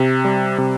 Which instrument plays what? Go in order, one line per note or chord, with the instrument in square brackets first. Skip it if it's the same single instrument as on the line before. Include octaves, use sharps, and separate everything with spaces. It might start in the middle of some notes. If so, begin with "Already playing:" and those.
Already playing: [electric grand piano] C3
G3
C3